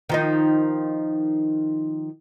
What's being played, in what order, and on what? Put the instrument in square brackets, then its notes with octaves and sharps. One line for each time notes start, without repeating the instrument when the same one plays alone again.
[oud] D#3 F3 D#4